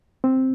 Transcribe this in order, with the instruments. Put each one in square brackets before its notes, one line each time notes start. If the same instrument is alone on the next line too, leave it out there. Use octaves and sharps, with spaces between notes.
[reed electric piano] C4